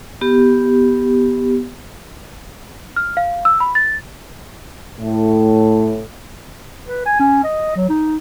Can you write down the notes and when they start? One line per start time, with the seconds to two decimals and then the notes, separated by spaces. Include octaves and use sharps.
0.21 B3 G4
2.96 F6
3.17 F5
3.45 E6
3.60 B5
3.75 A6
4.99 A2
6.87 B4
7.06 G#5
7.20 C#4
7.44 D#5
7.76 F#3
7.89 D#4